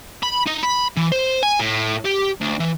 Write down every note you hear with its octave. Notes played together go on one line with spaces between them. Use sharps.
B5
D#4
B5
E3
C5
G#5
A2
G4
D2
E3